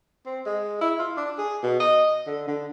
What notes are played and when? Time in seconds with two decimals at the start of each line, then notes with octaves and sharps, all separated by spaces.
0.26 C4
0.46 G#3
0.81 E4
0.99 F4
1.17 D4
1.38 G#4
1.63 B2
1.80 D#5
2.27 D3
2.48 D3